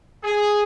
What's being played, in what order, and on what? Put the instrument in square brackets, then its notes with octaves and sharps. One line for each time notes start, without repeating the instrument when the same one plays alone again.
[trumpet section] G#4